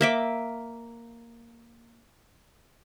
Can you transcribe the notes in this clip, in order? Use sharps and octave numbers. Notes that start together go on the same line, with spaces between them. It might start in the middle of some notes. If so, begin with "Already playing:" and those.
A#3 E5 D6